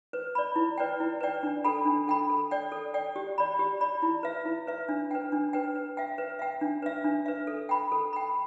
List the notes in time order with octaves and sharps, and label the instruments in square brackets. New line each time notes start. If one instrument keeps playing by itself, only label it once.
[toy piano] B4
D5 B5
E4
B4 D5 G5
E4
B4 D5 G5
D4
A4 G5 B5
D4
A4 G5 B5
A4
D5 G5
A4
D5 G5
G4
D5 B5
G4
D5 B5
E4
B4 E5
E4
B4 E5
D4
B4 G5
D4
B4 G5
B4
E5 G5
B4
E5 G5
D4
B4 E5
D4
B4 E5
A4
G5 B5
A4
G5 B5